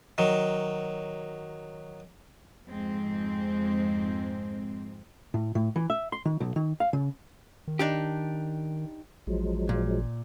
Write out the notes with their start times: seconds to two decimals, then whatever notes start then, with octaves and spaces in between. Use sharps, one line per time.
0.18 D#3 F#3
2.68 F2 G#2 G#3 C4
5.34 A2
5.55 A2
5.76 E3
5.90 E5
6.12 C6
6.25 D#3
6.40 B1
6.56 D#3
6.80 F5
6.93 C#3
7.68 D#3
7.79 D4 D#4 G4
9.27 A1 F3 F#3 G#3
9.69 A#2